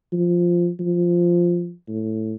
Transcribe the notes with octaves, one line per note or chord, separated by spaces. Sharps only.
F3
F3
A2